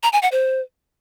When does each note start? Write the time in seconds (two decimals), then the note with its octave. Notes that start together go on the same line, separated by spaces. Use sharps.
0.03 A#5
0.13 G#5
0.22 F#5
0.32 C5